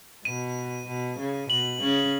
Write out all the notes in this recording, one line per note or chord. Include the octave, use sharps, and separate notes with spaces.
B2 D#7
B2
C#3
B2 F#7
C#3 C#4